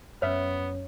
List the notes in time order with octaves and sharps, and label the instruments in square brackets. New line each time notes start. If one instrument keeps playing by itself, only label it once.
[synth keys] F#2 C#4 [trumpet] B3 [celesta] C#5 [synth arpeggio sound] E5 F6